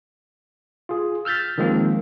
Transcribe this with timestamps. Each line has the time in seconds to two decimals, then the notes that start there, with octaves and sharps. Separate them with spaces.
0.89 F4 G#4
1.25 E6 F6 G6 A6 B6
1.58 D#3 F3 G#3 A#3 C4